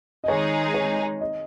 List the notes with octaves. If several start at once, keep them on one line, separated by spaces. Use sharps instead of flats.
D#5
D#3 G#3 D#4 G#4 C#5
C#5
D#5